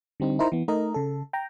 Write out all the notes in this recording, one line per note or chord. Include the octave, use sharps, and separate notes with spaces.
D3 G3 C4 D#4
D#4 E4 A#4 C5 A#5
E3 B3
A3 D#4 A#4 D#5
C#3 A4
G5 A#5